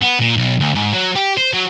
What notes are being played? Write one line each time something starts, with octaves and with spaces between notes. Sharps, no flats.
B3
A#2
B1
D2
G#2
F#3
G4
C5
F#3